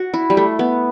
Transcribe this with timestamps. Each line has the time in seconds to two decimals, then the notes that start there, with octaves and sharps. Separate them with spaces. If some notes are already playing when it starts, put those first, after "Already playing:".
Already playing: F#4
0.14 E4
0.30 G3
0.37 A3
0.59 B3